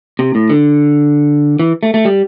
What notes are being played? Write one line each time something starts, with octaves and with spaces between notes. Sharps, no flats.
C3
A2
D3
E3
A3
A3
G3